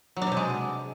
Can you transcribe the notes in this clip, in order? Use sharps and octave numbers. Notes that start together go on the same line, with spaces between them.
F#3
D4
B2
C3
G#3